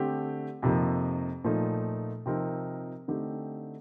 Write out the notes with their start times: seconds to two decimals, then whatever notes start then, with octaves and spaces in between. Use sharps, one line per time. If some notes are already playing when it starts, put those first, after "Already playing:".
Already playing: D3 A3 C4 G4
0.63 F2 C3 F3 A#3 D#4
1.44 A#2 F3 A3 D#4
2.26 C3 F3 C4 D#4 A#4
3.08 D3 A3 C4 D#4 G4